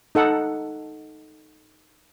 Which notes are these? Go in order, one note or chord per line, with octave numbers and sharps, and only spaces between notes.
D#4 A4 F#5